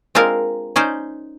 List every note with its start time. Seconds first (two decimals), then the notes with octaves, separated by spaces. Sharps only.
0.15 G#3 C4 D4 F4 A#4
0.76 C#4 D#4 C5 D5